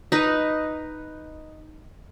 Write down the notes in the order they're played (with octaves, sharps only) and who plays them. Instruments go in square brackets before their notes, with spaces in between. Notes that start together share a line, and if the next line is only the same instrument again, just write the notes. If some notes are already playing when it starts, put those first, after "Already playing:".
[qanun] D#4 B4